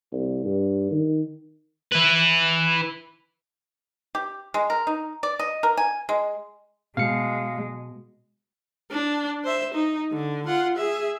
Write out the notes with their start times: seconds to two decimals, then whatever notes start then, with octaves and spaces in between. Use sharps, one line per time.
0.12 C2
0.44 G2
0.91 D#3
1.92 E4 B4
4.15 G4
4.54 G#3
4.70 A#4
4.87 D#4
5.23 D5
5.39 D#5
5.63 A#4
5.77 G#5
6.09 G#3
6.97 B2 G#3 F5 C#7
8.91 D4
9.44 C5 E5
9.74 D#4
10.12 D3
10.47 F4 F#5
10.77 G#4 E5